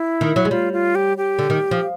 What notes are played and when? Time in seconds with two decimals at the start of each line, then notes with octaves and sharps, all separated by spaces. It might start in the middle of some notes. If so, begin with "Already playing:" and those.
Already playing: E4
0.21 D#3
0.36 F#3
0.45 G#3
0.50 G3 F4
0.73 F4
0.95 G4
1.17 G4
1.39 D3
1.50 D#3
1.71 F3